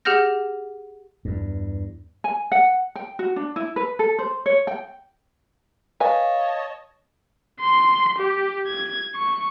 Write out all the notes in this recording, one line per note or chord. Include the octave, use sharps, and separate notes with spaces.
G4 G#4 F#5 F6 G6 A#6
E2 G2
G#5
F#5
G5
F#4
D4
E4
B4
A4
C5
C#5
G5
B4 C#5 D#5 F5 G#5 A5
C6
G4
G#6
C#6